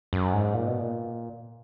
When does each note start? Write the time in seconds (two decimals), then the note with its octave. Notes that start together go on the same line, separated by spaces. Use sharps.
0.13 F#2
0.33 G#2
0.54 A#2
0.67 B2
0.80 A#2